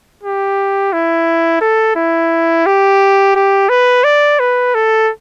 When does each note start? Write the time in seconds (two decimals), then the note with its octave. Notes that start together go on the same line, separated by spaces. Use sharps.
0.23 G4
0.93 E4
1.61 A4
1.96 E4
2.66 G4
3.36 G4
3.69 B4
4.04 D5
4.40 B4
4.74 A4